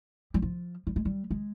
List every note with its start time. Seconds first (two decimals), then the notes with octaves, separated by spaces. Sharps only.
0.34 G3
0.42 F3
0.87 G3
0.96 G#3
1.05 G3
1.31 G#3